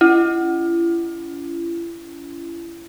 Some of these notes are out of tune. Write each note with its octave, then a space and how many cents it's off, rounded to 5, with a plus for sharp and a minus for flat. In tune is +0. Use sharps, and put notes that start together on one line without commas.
C#4 +30 E4 +40